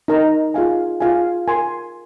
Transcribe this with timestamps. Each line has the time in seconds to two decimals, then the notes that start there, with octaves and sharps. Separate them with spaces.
0.08 D#4 A#4 D#5 A#5
0.54 F4 G#4 F5 G#5
1.00 F4 G#4 F5 G#5
1.48 A#4 G#5 C6